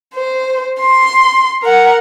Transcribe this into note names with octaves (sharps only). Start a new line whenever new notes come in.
C5
C6
A#4 F#5